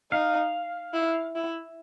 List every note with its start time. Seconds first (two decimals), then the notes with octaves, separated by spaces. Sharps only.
0.12 D#4 F5
0.93 E4
1.35 E4